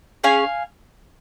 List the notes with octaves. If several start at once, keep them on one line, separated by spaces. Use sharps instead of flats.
C#4 G#4 F5 G#5